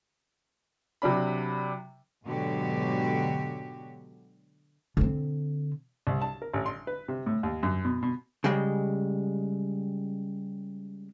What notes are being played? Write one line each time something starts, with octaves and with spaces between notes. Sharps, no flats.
C3 F#3 D4 B5
G#2 B2 D3 F#3 F#4 G4
D3 C4
C2
A5
A#4
A1
C6
B4
C3
A2
D#2
F#2
B2
B2
C#3 G3 G#3